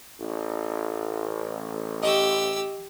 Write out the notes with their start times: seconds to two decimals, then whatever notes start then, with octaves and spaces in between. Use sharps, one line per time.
0.19 A1
2.03 G4 D#5 G5 C#6 E6